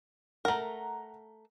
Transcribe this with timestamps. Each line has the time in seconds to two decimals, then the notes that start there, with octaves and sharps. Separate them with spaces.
0.45 A3 A#4 F#5 A#5